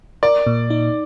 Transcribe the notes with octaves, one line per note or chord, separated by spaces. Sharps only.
A#4 D5
A#2
D#4